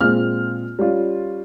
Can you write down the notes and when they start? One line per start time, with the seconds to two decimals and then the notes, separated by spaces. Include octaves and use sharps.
0.01 A#2 G#3 C4 F4 F6
0.79 G3 C#4 F4